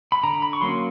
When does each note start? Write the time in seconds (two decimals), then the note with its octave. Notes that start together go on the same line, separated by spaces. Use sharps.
0.12 B5
0.23 D3 A#5
0.42 B5
0.53 C#6
0.61 F#3 A#3 C#4 C6